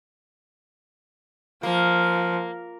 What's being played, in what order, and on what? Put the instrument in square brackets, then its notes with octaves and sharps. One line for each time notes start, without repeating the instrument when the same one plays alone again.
[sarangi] F3 [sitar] A#3